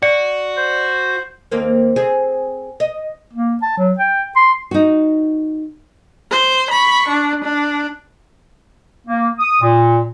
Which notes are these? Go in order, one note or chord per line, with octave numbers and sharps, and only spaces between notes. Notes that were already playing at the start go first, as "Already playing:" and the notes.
F#4 D5 C#7
C5
D#2 A#3 C4
C4 G#4
D#5
A#3
A5
F#3
G5
C6
D#4 F#4
C5
B5 C#6
D4
D4
A#3
D#6
A#2